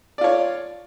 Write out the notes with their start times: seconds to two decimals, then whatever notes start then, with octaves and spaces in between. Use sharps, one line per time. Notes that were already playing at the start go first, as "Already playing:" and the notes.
0.18 D5
0.21 F4
0.24 C#5